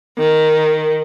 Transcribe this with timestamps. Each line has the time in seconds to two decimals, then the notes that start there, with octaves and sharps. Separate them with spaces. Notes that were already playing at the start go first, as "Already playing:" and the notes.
0.18 D#3